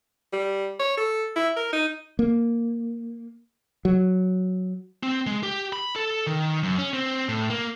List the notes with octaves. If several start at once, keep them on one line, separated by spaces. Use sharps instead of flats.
G3
C#5
A4
E4
A#4
D#4
A#3
F#3
C4
G#3
G4
B5
A4
D#3
F#2
C#4
C4
A2
A#3